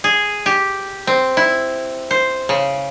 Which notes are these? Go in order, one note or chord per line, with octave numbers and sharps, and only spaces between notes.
G#4
G4
C4
E4
C5
C#3